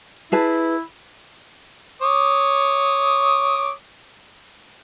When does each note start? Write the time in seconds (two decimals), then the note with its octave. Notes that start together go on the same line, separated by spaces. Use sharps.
0.32 E4 G#4 B4 A5
2.02 C#5 D6 D#6